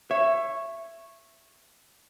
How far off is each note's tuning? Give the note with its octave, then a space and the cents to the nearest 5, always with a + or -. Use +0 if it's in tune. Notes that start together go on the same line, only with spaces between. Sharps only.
C#5 -10 E5 +20